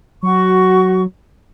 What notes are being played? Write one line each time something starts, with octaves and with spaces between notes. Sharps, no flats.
F#3 F#4 C#6